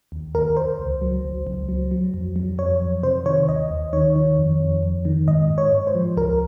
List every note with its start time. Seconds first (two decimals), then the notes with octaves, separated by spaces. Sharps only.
0.12 D#2
0.35 D#2 A#4
0.57 D#2 C5
0.79 C#2
1.01 F#3
1.24 C#2
1.47 C#2
1.69 F#3
1.91 F#3
2.14 F2
2.36 F#3
2.58 F2 C#5
2.81 F2
3.03 C3 C5
3.26 D#3 C#5
3.49 D#2 D#5
3.70 D#2
3.93 D#3 C#5
4.16 D#3
4.38 F2
4.60 F2
4.83 F2
5.05 D#3
5.28 G#2 D#5
5.50 G#2
5.58 C#5
5.73 G#2
5.87 C5
5.95 F3
6.17 C#2 A#4